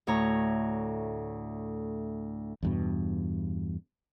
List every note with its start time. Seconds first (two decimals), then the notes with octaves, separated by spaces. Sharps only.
0.07 D2 A2 C#5 A#5
2.63 E2 G2 B2